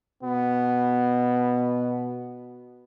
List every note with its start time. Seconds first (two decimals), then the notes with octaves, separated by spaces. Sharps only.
0.23 B2 B3